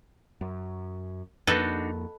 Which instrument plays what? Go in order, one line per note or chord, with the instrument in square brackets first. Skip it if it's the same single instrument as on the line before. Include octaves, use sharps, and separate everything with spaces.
[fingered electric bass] F#2
[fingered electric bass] F2 A#3 [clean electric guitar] D4 D#4 F#4 [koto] A4 B4 D#5